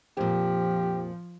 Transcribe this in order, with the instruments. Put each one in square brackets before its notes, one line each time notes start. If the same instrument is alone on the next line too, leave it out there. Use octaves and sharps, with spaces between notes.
[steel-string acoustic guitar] F2 A#2 [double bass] F3 [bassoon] G4